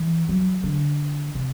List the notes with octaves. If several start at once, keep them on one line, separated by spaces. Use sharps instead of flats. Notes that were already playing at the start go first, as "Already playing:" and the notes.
Already playing: E3
F#3
D3
C3